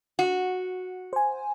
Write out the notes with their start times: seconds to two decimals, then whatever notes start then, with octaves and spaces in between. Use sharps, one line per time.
0.19 F#4
1.13 C5 G#5